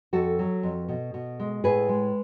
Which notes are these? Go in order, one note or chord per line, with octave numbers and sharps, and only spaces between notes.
F2 F#4 A4
F#3
F2
B2
B2
G#3
A2 G#4 B4
G#3